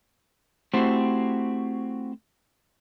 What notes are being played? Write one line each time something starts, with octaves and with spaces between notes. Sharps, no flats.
A3 C4 E4 F#4 G4 C5